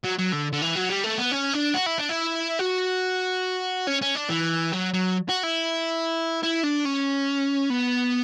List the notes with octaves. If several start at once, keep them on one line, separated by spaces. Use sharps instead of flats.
F#3
F#3
D3
D3
E3
F#3
G3
A3
B3
C#4
D4
F#4
E4
D4
E4
F#4
C#4
C#4
D4
E3
F#3
F#3
F#4
E4
E4
D4
C#4
B3